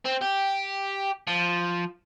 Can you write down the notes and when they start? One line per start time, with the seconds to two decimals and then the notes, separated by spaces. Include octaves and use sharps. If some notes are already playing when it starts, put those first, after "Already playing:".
0.05 C4
0.22 G4
1.27 F3